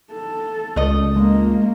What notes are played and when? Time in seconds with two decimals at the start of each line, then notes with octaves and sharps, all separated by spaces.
0.12 A4
0.76 C#2 A3 D#5
1.16 G#3 A#3